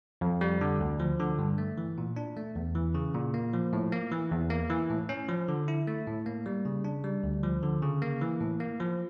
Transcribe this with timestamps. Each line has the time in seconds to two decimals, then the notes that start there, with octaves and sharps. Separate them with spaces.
0.21 F2
0.41 G3
0.61 D3
0.80 D2
1.00 F3
1.19 D3
1.39 G2
1.58 A3
1.78 E3
1.98 A#2
2.16 D4
2.37 A3
2.56 E2
2.75 E3
2.94 C#3
3.14 A#2
3.34 A#3
3.53 F3
3.73 A2
3.92 A#3
4.12 E3
4.31 E2
4.50 A#3
4.70 E3
4.90 A2
5.09 C#4
5.29 F3
5.48 D3
5.68 E4
5.87 A3
6.07 A2
6.26 A#3
6.46 G3
6.65 C#3
6.84 D4
7.04 G3
7.23 D2
7.43 F3
7.63 D3
7.82 C#3
8.02 A#3
8.21 E3
8.40 A2
8.60 A#3
8.80 F3